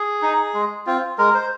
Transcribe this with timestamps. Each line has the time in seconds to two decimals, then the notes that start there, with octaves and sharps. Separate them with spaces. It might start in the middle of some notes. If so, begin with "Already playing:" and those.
Already playing: G#4
0.22 D#4
0.54 G#3
0.87 C4 F4
1.18 G#3 A#4
1.35 C5